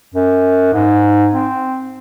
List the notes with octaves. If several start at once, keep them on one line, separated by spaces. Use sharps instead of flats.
F#2
G#2
C4